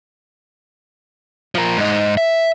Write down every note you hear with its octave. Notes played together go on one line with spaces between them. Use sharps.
F3 A#4
G#2 D#4
E5